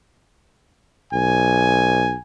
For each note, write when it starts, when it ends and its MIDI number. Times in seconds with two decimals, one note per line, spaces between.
1.13 2.16 35
1.13 2.21 80